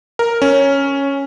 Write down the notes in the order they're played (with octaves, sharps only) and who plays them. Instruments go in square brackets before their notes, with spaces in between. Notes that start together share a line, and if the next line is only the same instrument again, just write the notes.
[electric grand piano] A#4
C#4